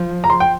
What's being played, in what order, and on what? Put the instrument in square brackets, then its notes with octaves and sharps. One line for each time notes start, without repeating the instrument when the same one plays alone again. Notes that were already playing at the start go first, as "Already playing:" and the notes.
Already playing: [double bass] F3
[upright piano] A#5
C6
G5